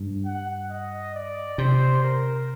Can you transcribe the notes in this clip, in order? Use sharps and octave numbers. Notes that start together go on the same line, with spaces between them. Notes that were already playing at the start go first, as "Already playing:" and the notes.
Already playing: G2
F#5
D#5
D5
C3 C5
A#4